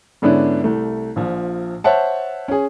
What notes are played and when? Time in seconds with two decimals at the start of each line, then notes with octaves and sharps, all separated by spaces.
0.22 G#2 D3 B3 C#4 D4 E4
0.64 C2 A3
1.16 A#1 F3
1.84 C5 C#5 E5 F#5 A5
2.48 C#4 G#4